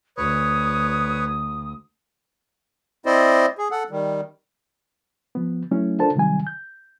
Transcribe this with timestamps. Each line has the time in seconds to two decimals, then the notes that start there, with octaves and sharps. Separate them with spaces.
0.17 D2 B4 C#5 D#6
3.06 C4 E4 C5 D5 D#5
3.58 G#4
3.71 A4 F#5
3.90 D#3 G3
5.35 F3 B3
5.71 F#3 A3 C#4 E4
5.99 D4 F4 A4 A#4 C5 A5
6.15 C3 D#3 F#3 G3 G#5
6.47 G6